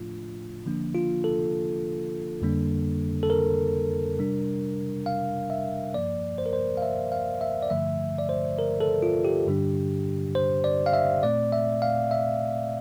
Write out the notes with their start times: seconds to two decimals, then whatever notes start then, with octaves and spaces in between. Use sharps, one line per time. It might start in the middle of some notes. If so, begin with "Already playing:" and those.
Already playing: A2 F3 A3 D4 F4
0.66 D3 F3 A#3 D4
0.95 F4
1.24 A4
2.42 F2 D3 G3 A#3 D4
3.23 A4
3.30 A#4
4.18 C3 G3 D4
5.06 F5
5.50 E5
5.94 G2 F3 A#3 D5
6.38 C5
6.46 A#4
6.53 C5
6.77 F5
6.82 E5
7.12 F5
7.41 E5
7.63 D5
7.70 G2 D3 F3 A3 E5
8.18 D5
8.29 C5
8.59 A#4
8.81 A4
9.02 F4
9.25 G4
9.47 G2 D3 G3 D4
10.35 C5
10.64 D5
10.86 F5
10.93 E5
11.23 A#2 A3 C4 D5
11.52 E5
11.82 F5
12.11 E5